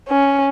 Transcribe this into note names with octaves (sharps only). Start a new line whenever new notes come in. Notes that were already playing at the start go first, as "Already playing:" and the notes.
C#4